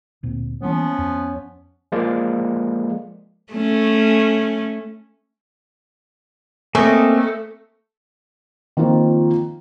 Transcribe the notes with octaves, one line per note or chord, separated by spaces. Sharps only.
D2 A#2 C4
E3 F3 G3 A#3 B3 C#4
F2
F3 G#3 A#3 D5
A3 C#4
A3 A#3 C4 C#4 D#5
D#3 F3 A#3 C4 F4 C5